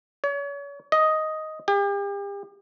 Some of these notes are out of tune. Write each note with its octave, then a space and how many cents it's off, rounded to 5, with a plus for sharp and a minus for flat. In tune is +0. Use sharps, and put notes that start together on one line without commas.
C#5 +35
D#5 +5
G4 +40